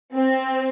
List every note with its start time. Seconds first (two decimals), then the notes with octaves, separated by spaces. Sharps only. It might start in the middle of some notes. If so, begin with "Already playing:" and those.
0.14 C4